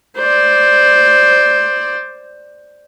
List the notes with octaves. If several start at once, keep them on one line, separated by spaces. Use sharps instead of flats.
C5 D5